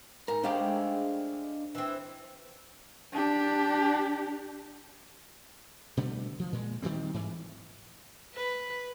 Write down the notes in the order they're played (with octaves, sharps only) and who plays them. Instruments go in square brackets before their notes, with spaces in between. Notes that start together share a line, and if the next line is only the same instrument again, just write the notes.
[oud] G#2 [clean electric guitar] A#4
[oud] G#3 A3 G4 [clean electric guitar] D4 C5 F5
[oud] E3 C4
[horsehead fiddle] D4 G4
[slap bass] B2 D3 G3 A3
F3
A#2 G#3
D#3 F3 G3 C4
G#2 E3
[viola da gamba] B4